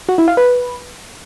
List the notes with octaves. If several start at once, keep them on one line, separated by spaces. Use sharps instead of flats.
F#4
E4
F5
B4